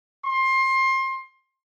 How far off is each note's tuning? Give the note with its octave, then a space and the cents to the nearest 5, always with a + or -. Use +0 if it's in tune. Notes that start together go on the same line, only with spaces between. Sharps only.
C6 +25